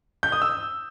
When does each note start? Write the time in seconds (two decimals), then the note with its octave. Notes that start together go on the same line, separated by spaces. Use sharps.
0.23 G6
0.32 D#6
0.42 E6